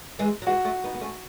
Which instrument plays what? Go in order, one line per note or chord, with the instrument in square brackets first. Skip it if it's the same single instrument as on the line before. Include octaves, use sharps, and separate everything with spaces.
[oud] E3 G#3
F#3
[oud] E3 G#3 [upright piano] F#4
[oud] F#3 A3
B3 D#4
B3
A3 C#4